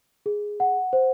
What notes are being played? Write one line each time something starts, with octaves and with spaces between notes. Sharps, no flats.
G#4
F#5
C5